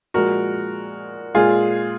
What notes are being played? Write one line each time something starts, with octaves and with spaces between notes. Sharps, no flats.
A#2 F3 G#3 F#4 A#4
A#2 G#3 F4 G#4